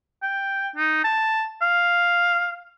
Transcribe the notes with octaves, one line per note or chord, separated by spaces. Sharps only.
G5
D#4
A5
F5